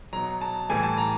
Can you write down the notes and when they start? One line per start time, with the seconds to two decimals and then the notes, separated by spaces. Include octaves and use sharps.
0.13 B2 F#3 A#5
0.41 A5
0.70 A2 E3 G3 G#5
0.83 A5
0.98 A#5